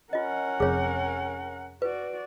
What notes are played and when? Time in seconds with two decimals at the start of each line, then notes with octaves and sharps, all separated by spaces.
0.13 C#4 F4 A#4 D#5 F#5
0.60 F1 F2 G#4 C#5
1.82 F#4 B4 D5